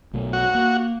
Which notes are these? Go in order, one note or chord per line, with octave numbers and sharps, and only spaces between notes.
B1 B2 A3
F#4
A#3